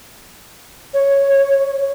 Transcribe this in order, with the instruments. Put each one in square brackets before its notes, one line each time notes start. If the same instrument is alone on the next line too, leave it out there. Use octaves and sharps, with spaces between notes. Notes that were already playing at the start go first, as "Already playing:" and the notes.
[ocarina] C#5